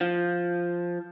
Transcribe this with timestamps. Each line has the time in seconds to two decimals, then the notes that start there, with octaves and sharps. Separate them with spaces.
0.01 F3